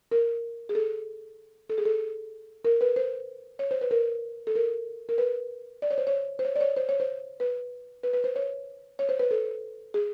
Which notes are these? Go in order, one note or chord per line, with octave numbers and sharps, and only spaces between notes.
A#4
G#4
A4
A4
G#4
A4
A#4
B4
C5
C#5
C5
B4
A#4
A4
A#4
A#4
B4
D5
C#5
C5
C#5
C5
C#5
D5
C#5
C5
C#5
C5
B4
B4
B4
C5
C#5
C#5
C5
B4
A4
G#4